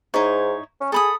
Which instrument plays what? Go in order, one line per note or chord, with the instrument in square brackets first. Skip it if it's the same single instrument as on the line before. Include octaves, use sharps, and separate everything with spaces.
[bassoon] G#2 [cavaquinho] D#4 E4 C#5
[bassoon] C#4
[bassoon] G#4 [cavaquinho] A4 B5 D#6